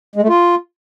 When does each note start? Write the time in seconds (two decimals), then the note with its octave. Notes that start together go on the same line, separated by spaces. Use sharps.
0.16 G#3
0.22 A3
0.29 F4